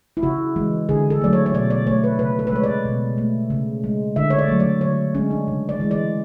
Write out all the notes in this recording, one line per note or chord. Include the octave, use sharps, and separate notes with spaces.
E4
C#3 F#4
E3 G#3
D3 G#4
A4
F#3 A3 D5
C#5
C#5
B2 D5
D5
A3 C#5
B4
C#3 B4
A4
B4
G#3 C#5
D5
B2
A3
C#3
G#3
D3 E5
C#5
D5
F#3 A3
D5
D3 C#5
G#3 C#4
D4
C#3
D5
E3 G#3
D5